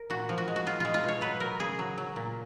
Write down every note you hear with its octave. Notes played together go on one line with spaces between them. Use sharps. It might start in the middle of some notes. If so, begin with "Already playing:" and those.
Already playing: A#4
A#2 F#4
F3
F#4
G#3
F#4
G#3 F4
G#3 F4
F4
B2 C#5
F#3 B4
F#3 A#4
C#3 G#4
F#3
F#3
A#2